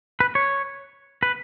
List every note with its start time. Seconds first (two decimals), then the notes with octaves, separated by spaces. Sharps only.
0.20 B4
0.35 C#5
1.23 B4